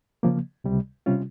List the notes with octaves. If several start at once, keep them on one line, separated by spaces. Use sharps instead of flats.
C#3 F3 A#3
C#2 C3 G3
C3 G3 C#4 F4